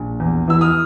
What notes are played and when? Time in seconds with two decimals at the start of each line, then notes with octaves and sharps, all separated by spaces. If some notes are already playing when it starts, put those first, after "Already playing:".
Already playing: A#1
0.20 E2
0.48 E3 E6
0.61 D#6 F6